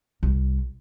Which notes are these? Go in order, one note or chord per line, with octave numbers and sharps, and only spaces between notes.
C2